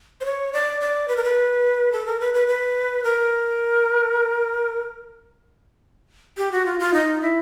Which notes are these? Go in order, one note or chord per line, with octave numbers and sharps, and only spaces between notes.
C5
C#5
D5
D5
B4
A#4
B4
A4
A#4
B4
B4
B4
A#4
G4
F#4
F4
F4
D#4
E4